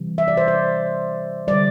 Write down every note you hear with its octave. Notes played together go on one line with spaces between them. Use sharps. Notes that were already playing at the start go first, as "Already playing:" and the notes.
Already playing: C3 E3 G3
E5
D5
C5
D5
D3 G3 D5